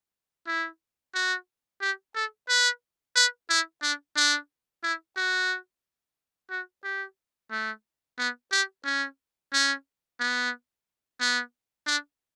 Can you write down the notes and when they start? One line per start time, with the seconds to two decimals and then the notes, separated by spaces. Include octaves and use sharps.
0.47 E4
1.14 F#4
1.81 G4
2.15 A4
2.49 B4
3.16 B4
3.50 E4
3.82 D4
4.16 D4
4.83 E4
5.16 F#4
6.51 F#4
6.84 G4
7.51 A3
8.18 B3
8.52 G4
8.85 C#4
9.53 C#4
10.20 B3
11.20 B3
11.86 D4